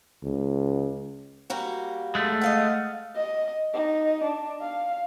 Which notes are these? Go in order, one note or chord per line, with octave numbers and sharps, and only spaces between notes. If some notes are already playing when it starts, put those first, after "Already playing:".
C#2
G3 A#3 F#4
G#3 A3
D#5 F5 F#5
D#5
D#4
D4
F5